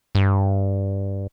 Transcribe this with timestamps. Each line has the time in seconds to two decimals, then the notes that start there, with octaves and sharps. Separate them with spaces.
0.15 G2